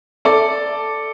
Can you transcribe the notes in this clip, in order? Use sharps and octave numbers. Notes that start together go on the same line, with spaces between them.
A4 D5